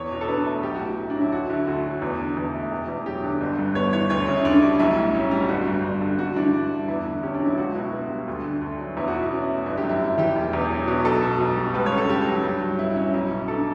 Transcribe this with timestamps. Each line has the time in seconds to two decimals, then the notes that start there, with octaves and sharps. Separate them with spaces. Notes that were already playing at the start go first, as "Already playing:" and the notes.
Already playing: E2 C#5
0.11 B2
0.21 A4
0.28 D4 B4
0.46 A3 A4
0.63 B1 G4
0.75 F#4
0.80 A2
0.86 G4
0.98 A3
1.10 D4
1.15 F#3
1.21 E4
1.32 D2 F#4
1.50 D3 E4
1.67 D2 F#4
1.84 F#3
2.02 E2
2.20 D3
2.37 E2
2.54 A3
2.71 E1
2.89 E2
3.06 F#3 G4
3.24 D3
3.41 G1
3.59 G2
3.75 B3 C#5
3.93 E3 C#5
4.10 D2 C#5
4.28 C#3
4.36 E4
4.45 D2 D4
4.62 G3
4.79 B1 E4
4.98 A2
5.15 C#4
5.31 G3
5.49 G1 F#4
5.67 G2
5.84 G1
6.01 D3
6.19 G2 F#4
6.36 E3 D4
6.53 G2
6.70 A3
6.88 E2 E4
7.06 D3
7.23 C#4 G4
7.34 D4
7.40 F#3
7.46 E4
7.58 C#2 F#4
7.75 B2 E4
7.92 B3
8.10 G3
8.27 D2
8.44 D3
8.61 D2
8.79 F#3
8.97 E2 E4
9.08 F#4
9.14 B2 E4
9.31 C#4
9.48 A3
9.66 G1 E4
9.77 G4
9.84 F#2
9.89 E4
10.01 A3
10.18 E3 G4
10.36 E1
10.53 E2
10.70 F#3
10.88 B2
11.05 B1 A4
11.23 B2
11.40 B1
11.57 G3
11.74 C#2 B4
11.86 C#5
11.92 C#3
11.98 A4
12.09 C#2 G4
12.26 F#3
12.44 G2
12.61 F#3
12.79 G2 E4
12.90 E4
12.96 C#4
13.02 E4
13.14 B1 E4
13.31 B2
13.48 D4 A4